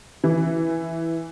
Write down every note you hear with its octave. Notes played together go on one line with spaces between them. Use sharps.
E3